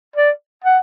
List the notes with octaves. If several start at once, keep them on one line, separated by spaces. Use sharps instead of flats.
D5
F#5